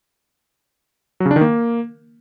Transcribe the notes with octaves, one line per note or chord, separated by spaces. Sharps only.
F#3
C#3
D4
D#3
A#3